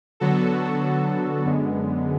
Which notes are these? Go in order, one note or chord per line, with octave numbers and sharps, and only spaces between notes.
D3 F#3 B3 F#4 A4
F#2 D3 G#3 B3